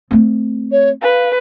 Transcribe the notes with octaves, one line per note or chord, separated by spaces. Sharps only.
A3 C4
C#5
B4 F5